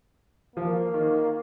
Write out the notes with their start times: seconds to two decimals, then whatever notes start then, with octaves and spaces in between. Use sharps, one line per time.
0.56 F3 A#3
0.94 D#3